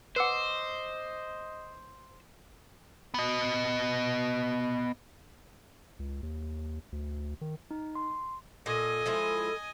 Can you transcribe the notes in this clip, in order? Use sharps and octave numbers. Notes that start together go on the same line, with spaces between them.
B4 C5 D#5 F#5 D6 E6 C7
B3 D#5
C#2
D#2
D2
D#3
D#4
C6
A#2 A4 D#5 G#5
F3 G#3 E4